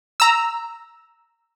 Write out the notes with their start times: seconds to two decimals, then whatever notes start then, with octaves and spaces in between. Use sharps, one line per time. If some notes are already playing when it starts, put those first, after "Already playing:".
0.20 A#5 E6